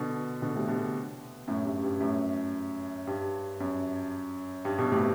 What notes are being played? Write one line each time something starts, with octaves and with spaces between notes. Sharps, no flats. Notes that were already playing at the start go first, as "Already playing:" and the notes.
Already playing: B2 D3
B2 D3
A2 C3
B2 D3
F#2 A2
G2
F#2
G2
F#2 A2
G2
F#2
G2
G2 B2
A2 C3